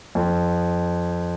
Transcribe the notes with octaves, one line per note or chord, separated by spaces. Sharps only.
F2